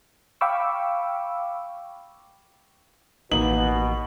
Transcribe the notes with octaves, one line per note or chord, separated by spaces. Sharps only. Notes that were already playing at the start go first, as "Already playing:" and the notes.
F5 G5 B5 C#6 D6 E6
A1 B2 D#3 A#3 D#4 F#7